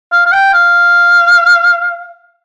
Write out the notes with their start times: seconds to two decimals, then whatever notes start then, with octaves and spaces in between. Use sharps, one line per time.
0.12 F5
0.26 F5
0.32 G5
0.53 F5